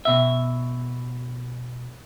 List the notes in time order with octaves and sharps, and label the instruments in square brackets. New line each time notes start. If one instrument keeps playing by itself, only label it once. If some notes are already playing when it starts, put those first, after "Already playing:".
[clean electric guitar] B2 E5